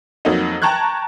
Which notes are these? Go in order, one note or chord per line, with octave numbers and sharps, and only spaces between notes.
F2 F#3 A#3 D#4
G5 A5 A#5 C#6 F#6 G#6